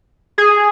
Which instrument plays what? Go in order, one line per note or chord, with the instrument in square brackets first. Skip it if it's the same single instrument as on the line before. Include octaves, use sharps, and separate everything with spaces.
[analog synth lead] G#4